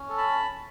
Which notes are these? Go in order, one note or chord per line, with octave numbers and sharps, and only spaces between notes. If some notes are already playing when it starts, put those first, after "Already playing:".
Already playing: C#4
A4
A5 B5